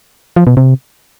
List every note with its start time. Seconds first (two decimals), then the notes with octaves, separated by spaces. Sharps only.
0.36 F3
0.47 B2
0.57 C3